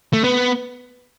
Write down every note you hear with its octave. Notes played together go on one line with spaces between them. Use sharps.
A3
B3